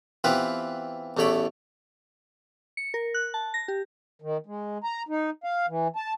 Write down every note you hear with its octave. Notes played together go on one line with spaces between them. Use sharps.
E3 B3 C4 F4 G4 B4
A1 E2 A3 C#5 B5 D6
C#7
A#4
F#6
A5
A#6
G4
D#3
G#3
A#5
D#4
F5
E3
A5